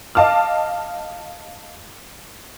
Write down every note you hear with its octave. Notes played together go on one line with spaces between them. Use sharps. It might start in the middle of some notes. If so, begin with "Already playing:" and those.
D#5 F5 A5 D6 F6